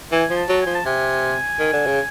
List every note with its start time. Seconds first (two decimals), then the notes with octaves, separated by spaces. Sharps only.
0.12 E3 G#5
0.30 F3
0.36 A5
0.49 F#3
0.61 G#5
0.67 F3
0.75 A5
0.85 C3 G#5
1.59 D#3
1.73 D3
1.86 C#3